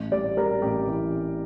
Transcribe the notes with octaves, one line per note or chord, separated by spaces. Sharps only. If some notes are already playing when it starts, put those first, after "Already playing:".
Already playing: A1
G3 D5
G3 A#4
A1 G4
E3